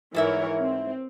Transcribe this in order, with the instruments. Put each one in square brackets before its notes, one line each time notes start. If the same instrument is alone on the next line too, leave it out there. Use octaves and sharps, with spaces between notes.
[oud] G#2 E4 E5 [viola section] E3 A#4 C#5
[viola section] C4